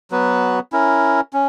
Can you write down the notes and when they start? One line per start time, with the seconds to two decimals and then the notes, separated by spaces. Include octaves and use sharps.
0.11 F#3 B3 F#4 B4
0.72 C#4 E4 A#4
1.33 C#4